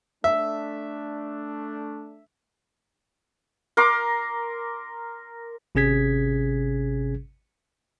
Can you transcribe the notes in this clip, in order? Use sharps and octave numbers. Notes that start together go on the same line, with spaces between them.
A3 D4 E5
A#4 C6 D6
G#1 C3 C#4 G#4 G#6 B6